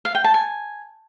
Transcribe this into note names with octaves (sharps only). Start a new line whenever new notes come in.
F5
G5
A5
G#5